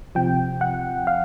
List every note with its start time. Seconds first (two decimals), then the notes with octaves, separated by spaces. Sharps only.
0.15 C3 F3 G5
0.61 F#5
1.07 F5